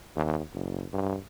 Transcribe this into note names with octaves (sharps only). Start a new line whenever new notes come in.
D#2
F#1
G2